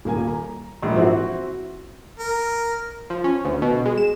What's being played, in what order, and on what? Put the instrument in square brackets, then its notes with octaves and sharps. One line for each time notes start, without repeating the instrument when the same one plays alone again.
[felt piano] D#1 A#3 G#5
A#5
[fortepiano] A#1 [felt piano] G#2
[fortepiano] E3 C4 F#4 [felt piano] C5 E5 F#5
[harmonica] A#4
[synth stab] F3
C#4
D2
B2
G#3
E7